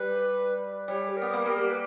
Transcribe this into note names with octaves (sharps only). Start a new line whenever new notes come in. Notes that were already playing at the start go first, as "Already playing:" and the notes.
Already playing: G3 B4
G3 C#5
G4
A#4
B3
A#3
G3 A#4
G4
B4